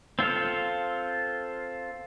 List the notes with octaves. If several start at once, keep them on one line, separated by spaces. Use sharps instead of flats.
C4 F4 A4 F5